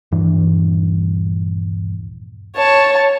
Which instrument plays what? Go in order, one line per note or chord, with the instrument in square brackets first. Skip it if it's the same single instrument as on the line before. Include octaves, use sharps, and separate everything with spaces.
[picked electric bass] D#1 G2 E3 D4
[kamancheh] C#5 A5